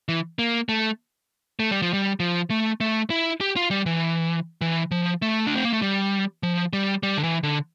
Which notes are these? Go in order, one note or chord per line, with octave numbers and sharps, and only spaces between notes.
E3
A#3
A3
A3
G3
F3
G3
F3
A3
A3
E4
G4
F4
G3
E3
E3
F3
A3
D4
C4
A#3
A3
G3
F3
G3
G3
D3
E3
D3